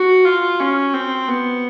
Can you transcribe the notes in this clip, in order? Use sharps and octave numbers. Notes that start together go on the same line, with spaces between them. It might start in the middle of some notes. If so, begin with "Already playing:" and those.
Already playing: F#4
F4
C#4
C4
B3